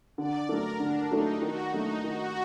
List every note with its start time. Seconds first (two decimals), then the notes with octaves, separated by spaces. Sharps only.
0.18 D3 D5
0.48 F#3 A3 D4 A4 A#4
0.80 D3 D4
1.10 F#3 A3 D4 D#4 A4
1.41 D#3 F#4
1.72 F#3 A3 D4 D#4
2.04 D#3 F#4